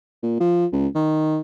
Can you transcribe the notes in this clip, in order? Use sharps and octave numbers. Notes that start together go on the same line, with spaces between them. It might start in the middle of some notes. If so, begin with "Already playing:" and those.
A#2
F3
C#2
D#3